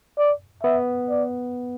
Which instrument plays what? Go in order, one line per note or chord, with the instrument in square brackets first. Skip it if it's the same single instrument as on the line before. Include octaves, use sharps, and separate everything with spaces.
[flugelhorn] D5
[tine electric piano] B3 [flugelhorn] E5
[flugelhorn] D5